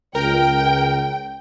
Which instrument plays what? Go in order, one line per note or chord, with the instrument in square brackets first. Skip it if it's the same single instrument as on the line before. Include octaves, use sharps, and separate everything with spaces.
[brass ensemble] C#2 [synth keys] A#4 [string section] G5